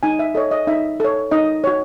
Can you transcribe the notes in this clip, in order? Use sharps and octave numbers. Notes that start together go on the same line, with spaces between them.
D#4 G#5
E5
A4 C#5 D#5
D#5
D#4 E5
A4 C#5
D#4 D#5
F#4 C#5